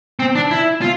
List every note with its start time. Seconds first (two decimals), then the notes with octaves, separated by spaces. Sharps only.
0.20 C4
0.35 D4
0.51 E4
0.82 F4